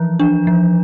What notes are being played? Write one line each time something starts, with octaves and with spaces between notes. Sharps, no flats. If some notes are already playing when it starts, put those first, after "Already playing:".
Already playing: E3 F3
D4
F3